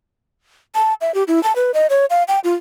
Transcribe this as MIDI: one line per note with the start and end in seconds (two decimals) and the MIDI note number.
0.75 0.94 81
1.01 1.14 76
1.15 1.23 67
1.28 1.42 64
1.43 1.55 81
1.56 1.71 71
1.74 1.87 75
1.90 2.06 73
2.10 2.23 77
2.28 2.39 79
2.44 2.54 65